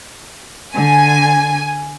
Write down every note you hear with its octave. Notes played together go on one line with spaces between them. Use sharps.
D3 G#5